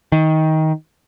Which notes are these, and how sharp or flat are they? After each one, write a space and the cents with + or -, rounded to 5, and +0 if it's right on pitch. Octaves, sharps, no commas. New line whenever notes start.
D#3 +20